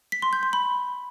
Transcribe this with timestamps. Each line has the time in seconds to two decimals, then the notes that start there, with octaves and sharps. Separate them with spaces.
0.12 B6
0.22 C6
0.33 G6
0.43 C6
0.53 B5